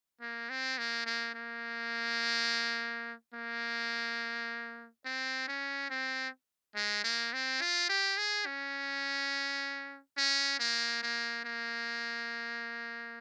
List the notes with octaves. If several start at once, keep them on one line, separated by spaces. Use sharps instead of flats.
A#3
C4
A#3
A#3
A#3
A#3
C4
C#4
C4
G#3
A#3
C4
F4
G4
G#4
C#4
C#4
A#3
A#3
A#3